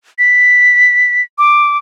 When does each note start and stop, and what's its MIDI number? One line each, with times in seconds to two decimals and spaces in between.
0.19 1.22 95
1.38 1.77 86